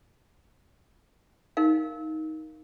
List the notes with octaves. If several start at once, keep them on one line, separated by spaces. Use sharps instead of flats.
D#4 A#4 F5